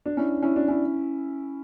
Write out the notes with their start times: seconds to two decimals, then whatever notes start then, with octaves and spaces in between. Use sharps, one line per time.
0.06 D4
0.17 C#4 E4
0.43 C#4 E4
0.56 D4
0.68 C#4 E4